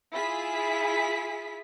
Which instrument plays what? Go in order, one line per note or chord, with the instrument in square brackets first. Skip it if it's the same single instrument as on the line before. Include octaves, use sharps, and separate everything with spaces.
[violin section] E4 F4 G#4 B6